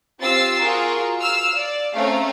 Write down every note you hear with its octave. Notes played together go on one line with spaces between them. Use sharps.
C4 F4 G4 E6 A6 C7
F4 F#4 G#4 A#4
F5 E6 F6
D5
A3 C4 C#4 F5 A#5